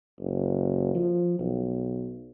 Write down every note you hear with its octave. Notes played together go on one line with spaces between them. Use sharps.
F#1
F3
B1